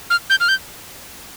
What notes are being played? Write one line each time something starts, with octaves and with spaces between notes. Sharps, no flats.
F6
G6
F6
G6